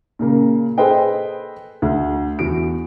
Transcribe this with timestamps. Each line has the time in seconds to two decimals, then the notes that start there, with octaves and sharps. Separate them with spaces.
0.19 A#2 C#3 A#3
0.78 G#4 A4 B4 C5 D#5 G5
1.82 D2
2.39 E2 F#4 D7